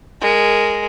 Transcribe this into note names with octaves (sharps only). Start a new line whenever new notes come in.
G#3 A#4